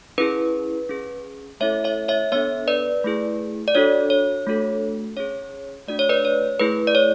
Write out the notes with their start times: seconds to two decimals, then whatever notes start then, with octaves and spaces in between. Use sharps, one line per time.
0.18 C#4 E4 G#4 B4
0.89 C#4 G#4
1.60 A3 C#4 E4 A4 C#5 E5
1.84 C#5 E5
2.08 C#5 E5
2.32 B3 D4 A4 C#5 E5
2.68 B4 D5
3.04 A3 E4 G#4
3.68 D5
3.75 D4 F#4 A4 C#5
4.10 C#5
4.47 A3 D4 F#4 A4
5.17 C#4 G#4 C#5
5.88 A3 D4 F#4 D5
5.99 C#5
6.09 B4 D5
6.25 C#5
6.59 A3 E4 G#4 B4
6.87 D5
6.95 C#5